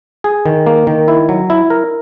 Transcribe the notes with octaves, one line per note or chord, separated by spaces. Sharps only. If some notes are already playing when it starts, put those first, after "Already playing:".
G#4
D#3
A#3
D#3
E4
F#3
E4
A#4